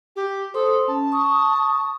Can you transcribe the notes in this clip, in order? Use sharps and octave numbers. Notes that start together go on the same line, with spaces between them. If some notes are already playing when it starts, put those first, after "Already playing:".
G4
A4 C5 C6 D#6
C#4 A5
C#6 D#6